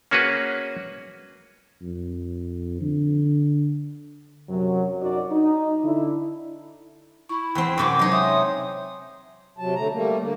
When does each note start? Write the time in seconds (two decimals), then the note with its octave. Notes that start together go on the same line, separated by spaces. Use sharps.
0.11 A#3 C#4 F#4 G#4 B4
1.82 F2
2.81 D3
4.50 F#2 C3 F#3
5.01 F#2 D#4 F#4 D5
5.32 D#4
5.84 D3 D4 E4
7.29 E4 C#6
7.55 E2 C4 G5
7.78 F#2 C3 F#3 D6
7.99 F#3 G#3 D#4
8.12 C#5 E5 C6 D#6
9.58 C3 F#3 A5
9.76 D3 A3 A#5
9.92 G3 A3 A#3
10.19 D3 A#3